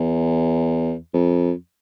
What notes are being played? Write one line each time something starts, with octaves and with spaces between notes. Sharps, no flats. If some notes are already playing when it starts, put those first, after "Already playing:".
Already playing: E2
F2